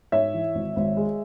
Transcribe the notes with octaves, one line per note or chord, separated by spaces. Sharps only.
G#2 C#5 E5
E3
G#1
G#1
G#3